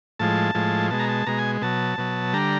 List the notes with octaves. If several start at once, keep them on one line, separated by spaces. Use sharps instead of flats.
A2 F3 G#3 A5
A2 F3 G#3
B2 G#3 A5
A#5
A5
B2 G#3 A#5
G#5
B2 F#3 A5
B2 F#3
D3 G3 A#5